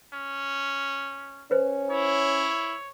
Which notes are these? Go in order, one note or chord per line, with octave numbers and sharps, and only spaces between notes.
C#4
C#4 B4 C5
E4 C#5